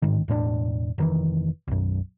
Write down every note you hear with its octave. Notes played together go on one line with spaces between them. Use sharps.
A1 G#2 D#3
E1 A2 A3 D4
F1 D#3 E3
B1 F#2